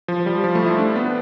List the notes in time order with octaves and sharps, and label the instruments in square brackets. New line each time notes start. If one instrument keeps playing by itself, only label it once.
[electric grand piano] F3
G3
F3
A3
E4
D4
B3